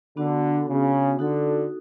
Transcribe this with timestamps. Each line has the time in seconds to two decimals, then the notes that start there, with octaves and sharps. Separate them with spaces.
0.17 D3 B3 D4 F#4
0.68 C#3
1.19 D3 D#4 F#4 A4